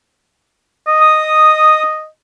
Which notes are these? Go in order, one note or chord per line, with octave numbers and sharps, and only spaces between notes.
D#5
D#6